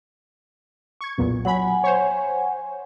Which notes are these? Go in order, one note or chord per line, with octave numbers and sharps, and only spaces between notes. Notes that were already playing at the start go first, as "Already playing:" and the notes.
C#6 G#6
B1 E2 A#2
F#3 F#5 G#5 B5
C5 C#5